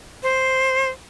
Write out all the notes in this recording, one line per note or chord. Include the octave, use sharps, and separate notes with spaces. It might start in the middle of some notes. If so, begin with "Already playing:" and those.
C5